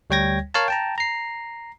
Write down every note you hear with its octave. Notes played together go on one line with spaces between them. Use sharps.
D2 G3 C#5 G5 G#6 A#6
A#4 C#5 F5 A5
G5 A5 A#5
A#5 C7